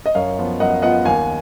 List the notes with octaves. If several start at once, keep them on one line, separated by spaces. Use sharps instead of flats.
D#5
F#2 C#5 F5
F3 B3 F4
F#2 D#5 F#5
F3 B3 F4 D#5 F#5
D#2 F5 G#5